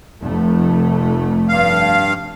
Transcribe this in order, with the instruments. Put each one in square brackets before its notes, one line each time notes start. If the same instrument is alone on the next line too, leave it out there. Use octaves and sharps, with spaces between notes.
[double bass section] F1 A3
[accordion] G2 F5